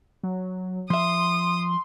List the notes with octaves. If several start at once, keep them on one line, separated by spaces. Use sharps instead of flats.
F#3
F3 E5 C6 D#6